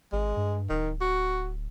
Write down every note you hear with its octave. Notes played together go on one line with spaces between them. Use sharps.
G#1 G#3
G2
D1 D#3
F#4